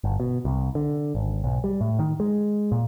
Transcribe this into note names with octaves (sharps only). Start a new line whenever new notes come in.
G1
B2
C2
D3
G#1
B1
G3
A2
D#3
G#3
A#2